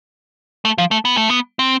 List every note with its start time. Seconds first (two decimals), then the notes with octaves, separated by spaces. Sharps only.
0.65 A3
0.78 F3
0.91 A3
1.05 B3
1.17 A3
1.30 B3
1.59 C4